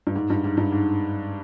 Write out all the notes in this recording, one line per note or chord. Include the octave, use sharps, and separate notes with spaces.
G2
G#2
G2
G#2
G2
G#2